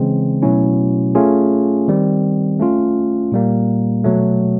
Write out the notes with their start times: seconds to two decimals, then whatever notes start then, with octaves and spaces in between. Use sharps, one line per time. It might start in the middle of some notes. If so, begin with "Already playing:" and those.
Already playing: C#3 E3 G#3 C4
0.42 B2 F#3 A3 C#4 E4
1.15 A3 C#4 F4 G#4
1.88 D#3 G3 C4
2.59 A3 C#4 F4
3.32 A#2 G3 A#3
4.04 B2 F#3 A3